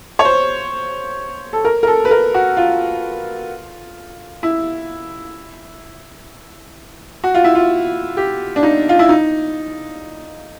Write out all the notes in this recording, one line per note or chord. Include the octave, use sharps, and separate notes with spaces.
C#5
C5
A4
A#4
A#4
A4
B4
A#4
F#4
F4
E4
F#4
F4
E4
F4
G4
D4
D#4
F4
E4
D#4